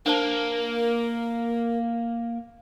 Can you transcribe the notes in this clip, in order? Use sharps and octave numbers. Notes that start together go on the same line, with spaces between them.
A#3 D4 A#4 C5 A5